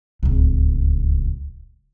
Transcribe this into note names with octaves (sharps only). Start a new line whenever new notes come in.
D1 C#2